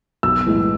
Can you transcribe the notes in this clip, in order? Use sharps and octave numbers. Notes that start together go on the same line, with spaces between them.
B1 E6
A2 E3 G#3